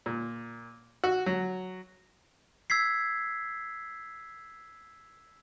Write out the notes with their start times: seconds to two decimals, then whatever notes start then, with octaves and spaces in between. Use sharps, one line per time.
0.06 A#2
1.04 F#4
1.26 F#3
2.70 E6 G#6 B6 C7